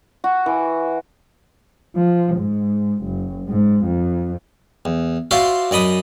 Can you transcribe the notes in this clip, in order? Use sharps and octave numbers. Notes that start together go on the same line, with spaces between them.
F#4
E3
F3
G#2
F#1
G#2
F2
E2
F4 F#4 C5 D5 E5 F5
F#2 D5 D#5 B5 D#6